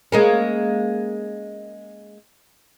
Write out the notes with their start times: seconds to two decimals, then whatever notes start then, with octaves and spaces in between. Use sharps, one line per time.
0.12 G#3 A#3 C#4